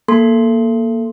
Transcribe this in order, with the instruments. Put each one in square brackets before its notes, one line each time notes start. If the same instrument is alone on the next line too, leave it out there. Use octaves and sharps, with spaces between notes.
[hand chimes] A#3 A4 C6